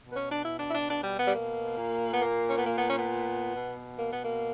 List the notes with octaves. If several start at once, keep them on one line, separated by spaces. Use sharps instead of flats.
B2
B3
C#4
D4
E4
D4
E4
D4
D4
G3
B3
G3
A#3
A#2
B3
A#3
C#4
B3
A#3
B3
C#4
B3
B2
A#3
B3
A#3